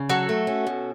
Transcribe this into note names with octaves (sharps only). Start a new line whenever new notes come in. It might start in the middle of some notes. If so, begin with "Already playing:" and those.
Already playing: C#3
F#3 F#4 A4
A3
C#4
B2